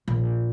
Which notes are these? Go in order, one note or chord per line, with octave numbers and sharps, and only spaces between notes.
A#1